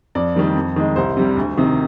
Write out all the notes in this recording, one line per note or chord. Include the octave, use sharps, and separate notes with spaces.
F2 D5
D#3 G3 A#3
F2
D#3 G#3
C2 C5
C3 G3
D2
C3 D#3